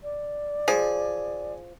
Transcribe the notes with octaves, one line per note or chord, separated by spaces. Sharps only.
D5
F3 G#4